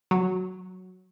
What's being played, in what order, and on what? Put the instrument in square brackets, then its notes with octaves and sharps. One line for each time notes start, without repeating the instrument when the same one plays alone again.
[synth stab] F#3